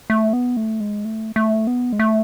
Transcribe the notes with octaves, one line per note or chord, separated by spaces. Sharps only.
A3
B3
A3
G#3
A3
A3
B3
G#3
A3